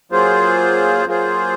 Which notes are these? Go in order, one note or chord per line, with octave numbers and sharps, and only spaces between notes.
F#3 A#3 F4 G#4 C5
F#3 A#3 F4 G#4 C5